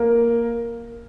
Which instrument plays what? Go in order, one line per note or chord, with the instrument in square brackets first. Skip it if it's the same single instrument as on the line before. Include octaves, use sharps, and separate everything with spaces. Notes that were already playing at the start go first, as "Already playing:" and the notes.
Already playing: [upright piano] A#3 A#4